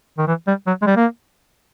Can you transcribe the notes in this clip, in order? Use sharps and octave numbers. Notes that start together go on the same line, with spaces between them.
D#3
E3
G3
F#3
G#3
G3
A#3